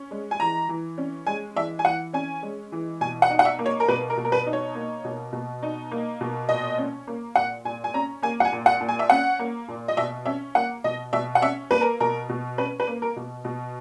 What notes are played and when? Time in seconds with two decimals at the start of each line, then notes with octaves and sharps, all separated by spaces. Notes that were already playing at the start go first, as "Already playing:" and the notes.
Already playing: C#4
0.11 G#3
0.31 G#5
0.40 E3 A#5
0.69 E3
0.98 C#4
1.26 G#3 G#5
1.56 E3 E5
1.79 G#5
1.85 E3 F#5
2.13 C#4 G#5
2.42 G#3
2.72 E3
3.01 B2 G#5
3.22 F#5
3.30 D#4
3.39 F#5
3.45 E5
3.59 A#3
3.66 C#5
3.80 A#4
3.88 B2 B4
4.10 A#4
4.17 B2
4.25 A#4
4.32 B4
4.46 D#4
4.53 C#5
4.75 A#3
5.04 B2
5.33 B2
5.63 D#4
5.91 A#3
6.21 B2
6.49 A#2 D#5
6.78 C#4
7.07 A#3
7.35 A#2 F#5
7.65 A#2 G#5
7.84 G#5
7.94 C#4 A#5
8.22 A#3 G#5
8.40 F#5
8.45 G#5
8.52 A#2
8.66 F#5
8.81 A#2
8.89 G#5
8.99 E5
9.10 C#4 F#5
9.39 A#3
9.68 A#2
9.88 D#5
9.97 B2 E5
10.26 C#4 E5
10.55 A#3 F#5
10.84 B2 D#5
11.13 B2 E5
11.35 F#5
11.42 C#4 E5
11.71 A#3 B4
11.81 A#4
12.00 B2 A#4
12.29 B2
12.58 C#4 B4
12.80 B4
12.87 A#3
13.02 A#4
13.16 B2
13.45 B2